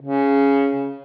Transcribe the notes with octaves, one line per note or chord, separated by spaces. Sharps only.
C#3